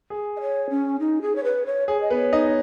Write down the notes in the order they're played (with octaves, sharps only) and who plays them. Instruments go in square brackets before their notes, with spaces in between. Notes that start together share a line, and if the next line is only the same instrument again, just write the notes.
[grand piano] G#4
[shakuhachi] D#5
C#5
C#4
D#4
G#4
C#5
B4
C#5
[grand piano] G#4 [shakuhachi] C#5
[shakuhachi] D#5
[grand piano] B3 B4
[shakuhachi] C#5
[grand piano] D#4 D#5